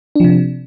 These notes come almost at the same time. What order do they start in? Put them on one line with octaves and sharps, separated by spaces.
D4 F3 C3